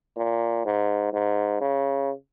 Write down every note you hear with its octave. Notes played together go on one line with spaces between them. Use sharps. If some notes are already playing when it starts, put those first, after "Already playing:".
A#2
G#2
G#2
C#3